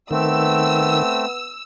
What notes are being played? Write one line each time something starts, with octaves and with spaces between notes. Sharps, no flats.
D#3 A3 B3 C4 E6